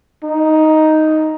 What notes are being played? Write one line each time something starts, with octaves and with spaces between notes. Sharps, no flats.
D#4